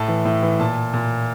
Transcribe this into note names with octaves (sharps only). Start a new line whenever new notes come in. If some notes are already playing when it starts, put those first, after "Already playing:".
Already playing: A2 A5
E3
A2
E3
A#2 A5
A#2